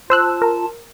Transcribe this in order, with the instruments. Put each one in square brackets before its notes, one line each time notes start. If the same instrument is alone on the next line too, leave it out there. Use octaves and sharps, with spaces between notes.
[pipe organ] F4 A5 [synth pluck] C5 E6 F#6
[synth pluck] A#4